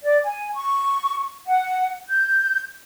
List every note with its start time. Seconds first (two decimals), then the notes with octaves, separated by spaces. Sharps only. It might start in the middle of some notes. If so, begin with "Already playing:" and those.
0.04 D5
0.24 G#5
0.55 C#6
1.46 F#5
2.09 G6